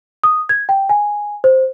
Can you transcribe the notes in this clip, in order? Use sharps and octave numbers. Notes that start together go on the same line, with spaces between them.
D#6
G#6
G5
G#5
C5